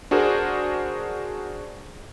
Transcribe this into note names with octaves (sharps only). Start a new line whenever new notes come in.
D4 F#4 G#4 A#4 C5